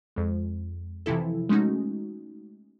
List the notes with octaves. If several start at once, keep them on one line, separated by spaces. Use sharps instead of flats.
F2 G#3
C3 E3 F3 E4 A4
G#3 A3 C#4 D#4 F#4